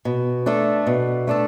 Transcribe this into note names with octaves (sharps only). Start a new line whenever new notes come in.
B2
A3 D4 A4
B2
A3 D4 A4